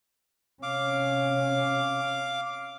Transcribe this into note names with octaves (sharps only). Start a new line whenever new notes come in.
C3 C#4 F5 D6